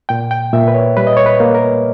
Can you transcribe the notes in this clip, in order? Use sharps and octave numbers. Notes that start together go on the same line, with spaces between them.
A#2 G5
G5
A#2 E5
B4
C#5
G3 B4
D#5
C#5
B4
A#3
A#4